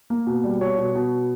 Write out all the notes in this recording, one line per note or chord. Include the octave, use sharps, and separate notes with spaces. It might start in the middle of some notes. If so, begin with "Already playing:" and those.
A#3
B2
G3
B2 C#5
B2
B2